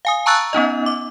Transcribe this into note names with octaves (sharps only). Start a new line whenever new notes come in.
F5 G#5 D#6
A5 A#5 C#6 E6 F#6 A6
B3 C#4 D#4 D#5
D6